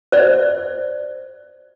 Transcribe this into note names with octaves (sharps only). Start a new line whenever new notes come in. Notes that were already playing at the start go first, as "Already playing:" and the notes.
C5 D5